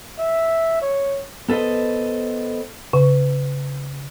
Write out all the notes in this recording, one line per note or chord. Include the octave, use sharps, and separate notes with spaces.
E5
C#5
B3 A4 B4 C5 D#5
C#3